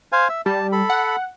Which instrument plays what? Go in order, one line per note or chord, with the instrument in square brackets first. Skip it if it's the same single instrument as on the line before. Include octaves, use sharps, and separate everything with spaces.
[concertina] C5 F5 G#5
E5
[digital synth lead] G3 [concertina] A5
[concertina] A4 B5
[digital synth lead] F#5